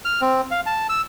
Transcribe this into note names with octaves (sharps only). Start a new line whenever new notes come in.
F6
C4
F5
A5
E6